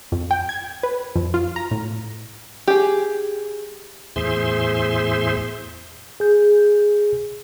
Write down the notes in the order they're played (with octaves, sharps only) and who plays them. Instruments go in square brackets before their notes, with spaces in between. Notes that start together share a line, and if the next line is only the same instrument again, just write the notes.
[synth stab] F2
G5
G#6
B4
F2
F4
A#5
A2
[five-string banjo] G4 G#4
[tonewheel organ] E2 A2 G#4 C5 E5 C6
[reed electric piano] G#4 G6